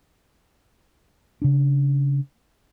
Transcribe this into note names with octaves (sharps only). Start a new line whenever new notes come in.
C#3 D4